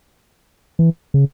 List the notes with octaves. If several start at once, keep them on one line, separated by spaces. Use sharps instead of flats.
E3
C#3